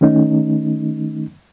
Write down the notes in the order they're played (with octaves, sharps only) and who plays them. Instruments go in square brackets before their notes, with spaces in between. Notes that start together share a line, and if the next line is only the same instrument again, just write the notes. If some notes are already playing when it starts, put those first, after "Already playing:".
[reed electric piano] D#3 A3 C#4 D#4